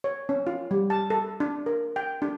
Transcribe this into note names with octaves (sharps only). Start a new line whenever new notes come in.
C#5
C#4
F4
G3
A5
A4
D4
A#4
G5
D4